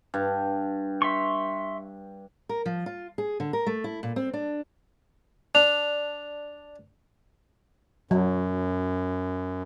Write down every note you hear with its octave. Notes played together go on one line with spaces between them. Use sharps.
G2
E5 C6 C#6
A#4
F3
F4
G#4
D3
A#4
A3
E4
A#2
C4
D4
D4 F7
F#2 F#3